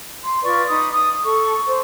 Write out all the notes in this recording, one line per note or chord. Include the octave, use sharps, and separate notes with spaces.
C6
F4 B4 D5 C#6
D#4 B5 D#6
D#6
A4 C#6
C5